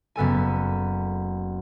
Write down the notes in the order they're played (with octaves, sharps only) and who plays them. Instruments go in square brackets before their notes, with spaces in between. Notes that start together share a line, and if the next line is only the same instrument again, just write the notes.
[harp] F#1 B3 A4 G#5